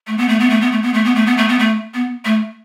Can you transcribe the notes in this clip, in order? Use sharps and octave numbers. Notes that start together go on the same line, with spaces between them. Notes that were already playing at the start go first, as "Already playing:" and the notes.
A3
B3
A3
B3
A3
B3
A3
B3
A3
B3
A3
B3
A3
B3
A3
B3
A3